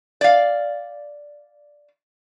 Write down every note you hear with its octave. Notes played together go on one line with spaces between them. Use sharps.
D5 F5